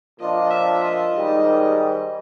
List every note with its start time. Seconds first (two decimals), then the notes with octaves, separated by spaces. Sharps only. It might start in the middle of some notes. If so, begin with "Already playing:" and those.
0.19 A#2 F3 A#3 D4 F4 D#5
0.51 E5
0.83 D#5
1.14 G#2 D#3 G3